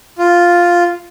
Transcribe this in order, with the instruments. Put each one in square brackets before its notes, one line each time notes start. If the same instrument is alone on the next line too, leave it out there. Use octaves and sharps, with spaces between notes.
[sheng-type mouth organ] F4